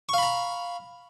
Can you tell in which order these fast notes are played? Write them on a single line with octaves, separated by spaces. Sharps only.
C#6 F5 B5 A#5